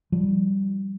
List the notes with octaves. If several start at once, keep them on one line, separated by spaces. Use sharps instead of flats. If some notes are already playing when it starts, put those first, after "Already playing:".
F3 G3